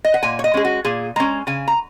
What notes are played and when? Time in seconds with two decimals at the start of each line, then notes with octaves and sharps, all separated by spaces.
0.05 D#5
0.14 F#5
0.23 A#2 G#5
0.39 C#5
0.44 D#5
0.54 G#3 C#4 G#4
0.65 F#4
0.85 A#2 G#4
1.16 G#3 C#4 A#5
1.47 C#3 G#5
1.68 A#5